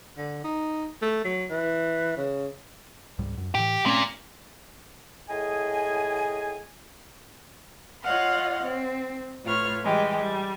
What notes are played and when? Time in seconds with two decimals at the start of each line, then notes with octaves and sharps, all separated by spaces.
0.17 D3
0.44 D#4
1.02 A3
1.25 F#3
1.50 E3
2.17 C#3
3.19 C#2 G#2 G3
3.38 F#2
3.55 A2 E3 G4
3.86 A#2 A3 C4 C#4
5.29 A2 G#4 D#5 G#5
8.03 F4 C#5 D#5 F5 F#5 C6
8.62 C4
9.44 A2 F4 B4 C#5 C#6 F6
9.82 E3 G3 G#3 G4
10.20 G3